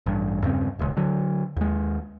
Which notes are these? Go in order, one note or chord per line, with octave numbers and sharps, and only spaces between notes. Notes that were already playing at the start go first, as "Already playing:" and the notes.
A1 G2
E2 G2 C#3 C4
D#1 C#2
D3 F#3
D#2 G#3